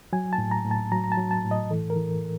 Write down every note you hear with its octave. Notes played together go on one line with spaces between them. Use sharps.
F#3 G#5
A5
A2
A#5
A2
A5
F#3 A#5
A#5
A5
F#3
A5
A2
D#5
E3 A4
A#4
E3